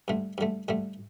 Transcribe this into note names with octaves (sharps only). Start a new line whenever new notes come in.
G2 D3 A3
G2 D3 A3
G2 D3 A3